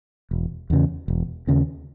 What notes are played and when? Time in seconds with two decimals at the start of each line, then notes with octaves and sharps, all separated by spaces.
0.31 E1
0.70 E2 C#3
1.08 E1
1.47 D#2 C#3